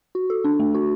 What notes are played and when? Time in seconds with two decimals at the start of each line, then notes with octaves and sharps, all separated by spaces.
0.15 F#4
0.30 A4
0.44 D4
0.60 A3
0.74 F#4